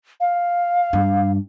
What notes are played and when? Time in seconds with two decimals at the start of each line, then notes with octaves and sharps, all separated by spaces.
0.20 F5
0.93 G2